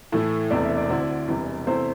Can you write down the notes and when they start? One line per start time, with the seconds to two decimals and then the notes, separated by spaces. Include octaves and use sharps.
0.12 A2 E3 A3 E4 A4
0.51 E1 E2 C3 A3 E4 D5
0.64 E5
0.77 D5
0.90 D2 D3 C4 E4
1.28 E1 E2 C3 E3 G3
1.67 E2 C3 A3 E4 C5